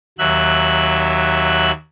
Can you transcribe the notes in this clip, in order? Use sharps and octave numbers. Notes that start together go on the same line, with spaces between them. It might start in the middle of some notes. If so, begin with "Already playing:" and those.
D#2 F#3 E5 F#6